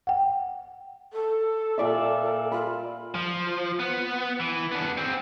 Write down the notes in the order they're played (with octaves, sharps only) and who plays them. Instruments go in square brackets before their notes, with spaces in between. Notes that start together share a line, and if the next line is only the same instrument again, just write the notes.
[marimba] F#5 G5
[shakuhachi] A4
[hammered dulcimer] A#2 D5 E5
[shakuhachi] F4 [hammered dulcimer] B5
[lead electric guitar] F3
B3
E3
B3 D4
C4 G#4